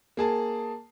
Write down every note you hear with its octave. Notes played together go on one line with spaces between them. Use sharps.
A#3 G#4 A5